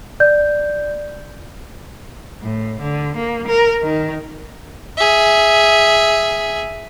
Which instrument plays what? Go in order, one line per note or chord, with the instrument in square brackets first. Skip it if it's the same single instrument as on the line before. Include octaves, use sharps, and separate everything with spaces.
[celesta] D5 G6
[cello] A2
D3
A#3
A#4
D#3
[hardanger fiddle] G#4 E5